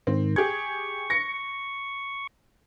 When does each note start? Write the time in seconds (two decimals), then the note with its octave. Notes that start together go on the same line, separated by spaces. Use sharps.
0.07 G#2 D#3 C4
0.36 G4 G#4 C#6 G#6
1.10 A#6 C#7